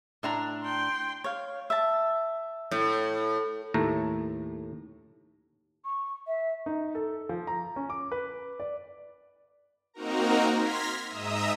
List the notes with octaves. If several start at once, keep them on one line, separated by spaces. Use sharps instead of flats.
A2 D4 A#5
G5 C6
C#5 F5
E5 A5
A2
D#2 A2 A3 A#5
C#6
E5
D#4
A4
F3
A#5
C#4
D6
B4
D5
A#3 C4 D#4 F#4 A#4 A#5
C6 F6 G#6 A#6 B6
G#2 D#5 E5 A#5 D#6 E6